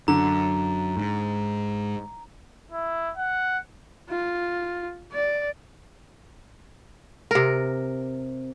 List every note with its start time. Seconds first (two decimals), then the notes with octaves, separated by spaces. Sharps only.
0.08 F#2 D3 A#5
0.97 G#2
2.72 E4
3.17 F#5
4.10 F4
5.12 D5
7.31 C3 A#4